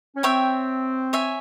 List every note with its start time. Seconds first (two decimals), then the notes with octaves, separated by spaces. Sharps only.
0.15 C#4
0.23 C4 C#5 E5 G5
1.13 C#5 E5 G#5